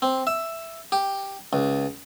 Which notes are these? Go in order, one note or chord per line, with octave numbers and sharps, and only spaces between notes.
C4
E5
G4
C#2